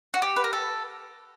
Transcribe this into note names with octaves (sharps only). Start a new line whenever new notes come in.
F#4
G4
B4
A#4
A4